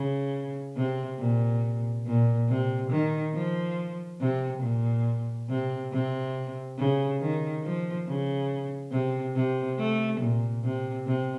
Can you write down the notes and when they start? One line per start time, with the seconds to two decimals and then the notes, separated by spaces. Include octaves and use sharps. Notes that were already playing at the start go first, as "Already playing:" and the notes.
Already playing: C#3
0.76 C3
1.19 A#2
2.06 A#2
2.49 C3
2.91 D#3
3.34 F3
4.20 C3
4.62 A#2
5.49 C3
5.92 C3
6.78 C#3
7.20 D#3
7.63 F3
8.07 C#3
8.91 C3
9.36 C3
9.79 A3
10.20 A#2
10.63 C3
11.06 C3